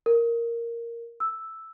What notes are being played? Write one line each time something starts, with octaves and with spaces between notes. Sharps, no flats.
A#4
E6